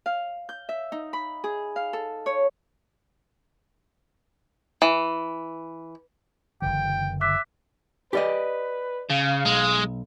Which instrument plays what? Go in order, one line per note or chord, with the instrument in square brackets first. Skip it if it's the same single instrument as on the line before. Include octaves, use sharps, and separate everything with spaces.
[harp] F5
G6
E5
D#4
B5
G#4
F5
A4
C#5
[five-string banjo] E3
[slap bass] F#1 D3 E3 [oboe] G5
[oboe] E5 [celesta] D6 F#6 B6
[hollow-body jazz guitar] G4 D5 D#5 [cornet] B4
[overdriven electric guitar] C#3 [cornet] F5
[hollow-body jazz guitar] B1 [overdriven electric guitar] G#3